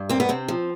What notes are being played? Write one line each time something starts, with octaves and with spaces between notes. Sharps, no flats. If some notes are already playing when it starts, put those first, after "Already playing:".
Already playing: G2
A#3 C4
B3
C3 C4
F3